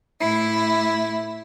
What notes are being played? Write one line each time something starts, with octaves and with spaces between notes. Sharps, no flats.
A2 E4